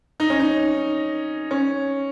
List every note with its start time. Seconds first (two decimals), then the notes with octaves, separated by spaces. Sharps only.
0.20 D#4
0.30 C#4
0.40 D#4
1.51 C#4